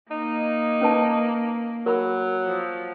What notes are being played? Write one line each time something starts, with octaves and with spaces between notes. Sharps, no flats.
A#3 D#4
C#4 B4 A5
F#3 A#4 B5
F3